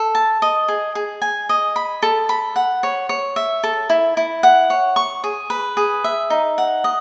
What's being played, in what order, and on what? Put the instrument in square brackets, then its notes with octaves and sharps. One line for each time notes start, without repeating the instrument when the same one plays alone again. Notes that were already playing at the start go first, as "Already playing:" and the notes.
Already playing: [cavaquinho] A4
A5
D#5
G#4
G#4
G#5
D#5
B5
A4
B5
F#5
C#5
C#5
E5
A4
E4
E4
F#5
C#5
C#6
G#4
B4
G#4
E5
D#4
F#5
D#5